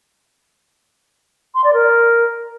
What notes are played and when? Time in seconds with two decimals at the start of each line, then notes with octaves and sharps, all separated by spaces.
1.54 C6
1.64 D5
1.73 A#4